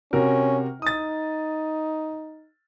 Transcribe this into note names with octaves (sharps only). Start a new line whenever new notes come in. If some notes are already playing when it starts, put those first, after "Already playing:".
C3 C#4 F#4 A#4
D#4 D#6 A6